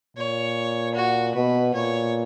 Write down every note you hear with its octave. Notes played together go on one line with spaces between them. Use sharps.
A#2 C#5
F#4
B2 B4
A#2 C#5